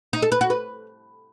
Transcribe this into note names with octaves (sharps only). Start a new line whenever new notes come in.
D#4
A4
B4
F#4
B4